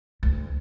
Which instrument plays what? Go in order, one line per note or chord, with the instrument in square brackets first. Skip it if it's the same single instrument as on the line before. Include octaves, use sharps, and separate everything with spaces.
[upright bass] D2